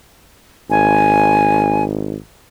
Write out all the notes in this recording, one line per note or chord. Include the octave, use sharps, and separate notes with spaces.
G#1 G#5